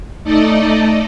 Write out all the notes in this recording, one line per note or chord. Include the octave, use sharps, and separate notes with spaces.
A3 D#4 A4 D5 D#5